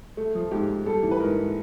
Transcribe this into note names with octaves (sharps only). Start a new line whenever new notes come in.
A3
F3
G#2 G4
G#2
G3 A4
E3
B4
G#2 A#4
G#2